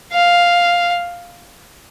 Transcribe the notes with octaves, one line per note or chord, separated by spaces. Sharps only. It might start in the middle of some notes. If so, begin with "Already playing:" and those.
F5